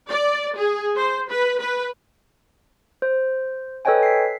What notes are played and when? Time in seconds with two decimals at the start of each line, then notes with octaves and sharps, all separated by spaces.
0.10 D5
0.56 G#4
0.96 C5
1.30 B4
1.60 B4
3.02 C5
3.85 A4 B4 C#5 D#5 G5 G#5
4.03 B6 C7